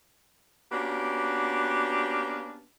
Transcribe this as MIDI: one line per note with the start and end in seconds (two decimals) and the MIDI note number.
0.72 2.63 58
0.72 2.63 59
0.72 2.63 61
0.72 2.63 62
0.72 2.63 66
0.72 2.63 67